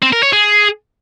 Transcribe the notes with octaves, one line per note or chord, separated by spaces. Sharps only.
C4
A#4
C#5
G#4